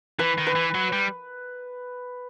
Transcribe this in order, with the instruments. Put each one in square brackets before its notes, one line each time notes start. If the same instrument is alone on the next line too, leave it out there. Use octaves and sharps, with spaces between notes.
[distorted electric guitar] E3 [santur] B4
[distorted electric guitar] D#3
[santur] B4
[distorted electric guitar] E3
F#3
G3